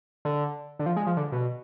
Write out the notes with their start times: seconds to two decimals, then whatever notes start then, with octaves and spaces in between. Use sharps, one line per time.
0.25 D3
0.80 D3
0.86 F3
0.97 G#3
1.07 F3
1.17 D3
1.32 B2